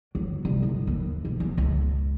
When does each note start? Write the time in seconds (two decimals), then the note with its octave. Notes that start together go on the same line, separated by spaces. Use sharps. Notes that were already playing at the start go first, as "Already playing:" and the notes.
0.15 F#3
0.45 C2
0.63 G1
0.87 D#2
1.25 B2
1.40 E2
1.57 C#2